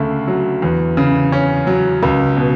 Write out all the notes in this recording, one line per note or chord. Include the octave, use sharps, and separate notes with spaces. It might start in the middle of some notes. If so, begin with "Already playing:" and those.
Already playing: D2 C#3 A3
F#3
E2
C#3
C#4
F#3
C#2
B2